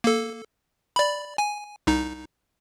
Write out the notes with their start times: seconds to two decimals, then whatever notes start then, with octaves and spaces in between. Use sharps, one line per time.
0.04 A#3 A4
0.96 D5 B5
1.38 G#5
1.87 C2 D#4